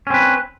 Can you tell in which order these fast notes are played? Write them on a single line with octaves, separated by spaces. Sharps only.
C#4 C4 B4